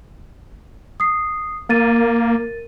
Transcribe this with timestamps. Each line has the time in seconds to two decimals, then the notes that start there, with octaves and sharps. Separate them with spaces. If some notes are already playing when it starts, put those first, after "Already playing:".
1.00 D#6 C7
1.69 A#3 A#4 A6 D#7